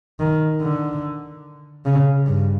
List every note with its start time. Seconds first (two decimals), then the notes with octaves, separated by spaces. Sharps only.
0.20 D#3
0.61 D3
1.86 C#3
2.27 G2